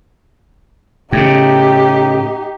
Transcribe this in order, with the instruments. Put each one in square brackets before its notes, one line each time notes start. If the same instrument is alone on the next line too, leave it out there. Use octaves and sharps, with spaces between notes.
[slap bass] A2 C#3 [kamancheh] D#4 G4